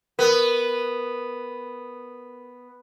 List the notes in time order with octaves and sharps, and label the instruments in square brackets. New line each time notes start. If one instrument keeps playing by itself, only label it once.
[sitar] B3 [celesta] A#4